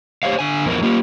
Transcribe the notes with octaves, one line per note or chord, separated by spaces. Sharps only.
G4 C5 C#5 F5
D3 G#5
E2 F3 B3 E4 A#4
A#3 F4 G4